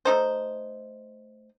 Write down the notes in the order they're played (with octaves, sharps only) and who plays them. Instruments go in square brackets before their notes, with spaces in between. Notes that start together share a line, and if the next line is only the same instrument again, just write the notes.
[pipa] A3 D#4 C5